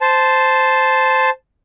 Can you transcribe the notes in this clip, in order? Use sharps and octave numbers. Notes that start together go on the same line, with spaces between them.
C5 A5